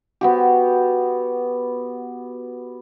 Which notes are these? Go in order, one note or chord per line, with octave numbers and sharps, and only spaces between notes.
B3 F#4 G4